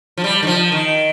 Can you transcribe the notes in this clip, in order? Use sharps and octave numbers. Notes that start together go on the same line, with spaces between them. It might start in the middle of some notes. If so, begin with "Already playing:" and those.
F3
G3
D#3
F3
D#3